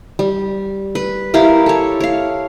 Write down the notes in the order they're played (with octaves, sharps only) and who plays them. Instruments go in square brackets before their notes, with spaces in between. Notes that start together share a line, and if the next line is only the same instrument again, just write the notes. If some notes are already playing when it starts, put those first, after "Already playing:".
[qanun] G3
B4
E4 G4 A#4 F5
A4 C#5
C#5 F5